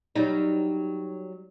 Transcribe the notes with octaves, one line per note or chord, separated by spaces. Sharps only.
F#3 G3 D#4